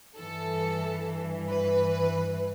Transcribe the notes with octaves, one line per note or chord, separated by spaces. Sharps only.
G2 E3 A4
B4